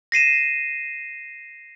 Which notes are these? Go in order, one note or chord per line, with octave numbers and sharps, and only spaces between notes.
A#6 C7 D#7 E7